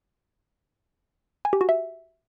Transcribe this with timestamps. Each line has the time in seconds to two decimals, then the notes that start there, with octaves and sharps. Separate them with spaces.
1.45 G#5
1.53 G4
1.61 F#4
1.69 E5